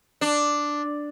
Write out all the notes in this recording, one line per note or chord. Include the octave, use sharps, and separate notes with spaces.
D4